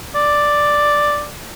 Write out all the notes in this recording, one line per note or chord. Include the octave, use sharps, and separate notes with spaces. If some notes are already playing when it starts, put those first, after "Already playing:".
D5